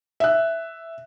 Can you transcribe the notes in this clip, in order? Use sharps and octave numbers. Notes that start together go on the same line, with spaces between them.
E5 F#6